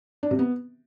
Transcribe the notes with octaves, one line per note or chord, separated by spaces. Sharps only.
D4
C3
B3